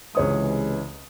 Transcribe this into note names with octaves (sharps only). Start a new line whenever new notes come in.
C#2 C3 E3 G#3 C#5 D#6